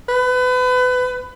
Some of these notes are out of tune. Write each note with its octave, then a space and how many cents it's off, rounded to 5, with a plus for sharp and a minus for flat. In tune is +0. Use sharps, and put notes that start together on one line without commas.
B4 +30